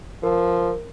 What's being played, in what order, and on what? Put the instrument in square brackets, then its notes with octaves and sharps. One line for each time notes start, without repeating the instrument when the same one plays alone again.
[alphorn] F3 [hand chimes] A#4